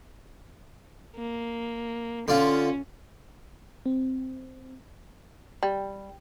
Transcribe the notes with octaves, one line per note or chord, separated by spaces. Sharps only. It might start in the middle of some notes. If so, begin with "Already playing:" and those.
A#3
D3 C#4 F4
C4
G3